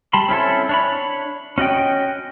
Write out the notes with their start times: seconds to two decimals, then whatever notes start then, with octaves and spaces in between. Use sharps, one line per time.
0.13 G3 A5 B5 C6
0.28 C4 C#4 E4 A4
0.69 D4 C#5 B5
1.58 C#4 F#4 D#5 G5